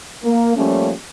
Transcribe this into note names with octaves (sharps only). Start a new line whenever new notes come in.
A#3
F3 G3 A3 A#3 C#4